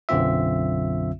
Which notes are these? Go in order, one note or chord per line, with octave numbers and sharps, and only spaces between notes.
B1 F#2 D3 C4 F4 E5